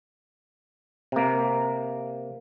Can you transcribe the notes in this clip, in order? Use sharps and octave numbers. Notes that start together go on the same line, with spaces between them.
C3 A#3